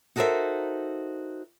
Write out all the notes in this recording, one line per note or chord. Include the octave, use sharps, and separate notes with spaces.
D#4 F#4 A4 A#4 C5 E5